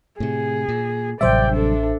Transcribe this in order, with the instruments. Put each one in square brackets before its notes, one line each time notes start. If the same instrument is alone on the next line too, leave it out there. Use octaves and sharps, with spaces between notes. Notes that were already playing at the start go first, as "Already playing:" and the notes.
[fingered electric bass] A2 C3 [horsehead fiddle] G#4
[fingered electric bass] A#2
[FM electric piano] A1 C5 E5 [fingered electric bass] C3 F#3 G3 [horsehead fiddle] D5 G5
[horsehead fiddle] D4 A4